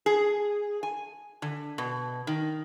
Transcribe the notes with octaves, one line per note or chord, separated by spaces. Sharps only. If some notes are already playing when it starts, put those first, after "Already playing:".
G#4
G#5
D3
B2
D#3